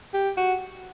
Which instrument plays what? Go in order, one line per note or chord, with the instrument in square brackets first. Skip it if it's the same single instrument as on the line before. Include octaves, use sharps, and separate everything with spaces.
[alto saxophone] G4
F#4